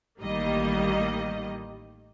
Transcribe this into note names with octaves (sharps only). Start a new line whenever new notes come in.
A1 D#3 G3 A#3 D#5